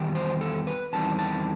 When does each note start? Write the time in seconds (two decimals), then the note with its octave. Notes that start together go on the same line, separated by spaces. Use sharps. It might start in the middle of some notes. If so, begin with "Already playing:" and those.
Already playing: E2 D#3 G3
0.15 C5
0.41 A4
0.67 B4
0.93 E2 D#3 G3 C4 A5
1.19 A5